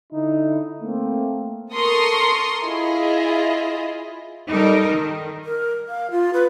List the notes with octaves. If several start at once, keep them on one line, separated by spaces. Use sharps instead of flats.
D3 D#4 E4
A3 A#3 C4
A4 A#4 C6 C#6 D#6
E4 F4 G#4 D#5
G3 D#4 A4 A#4
D#3
A#4
F5
F4
B4